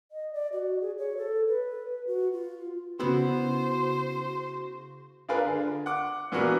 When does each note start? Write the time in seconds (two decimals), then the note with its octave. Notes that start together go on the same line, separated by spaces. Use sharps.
0.11 D#5
0.33 D5
0.53 F#4
0.81 G#4
0.98 C#5
1.17 A4
1.48 B4
2.07 F#4
2.32 F4
3.00 C#3 B3 E4 F#4 C5
5.29 D4 F4 G#4 A#4 B4 D5
5.45 D3
5.86 F#5 D6
6.32 A#2 E3 B3 D4 F#4 A#4